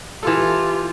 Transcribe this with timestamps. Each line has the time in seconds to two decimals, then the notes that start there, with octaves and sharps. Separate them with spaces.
0.23 E3 F4 G4 A4